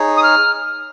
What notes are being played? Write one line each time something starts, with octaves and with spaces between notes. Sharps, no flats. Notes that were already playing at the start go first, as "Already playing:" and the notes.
Already playing: D#4 G#4 C#5
D#6
F6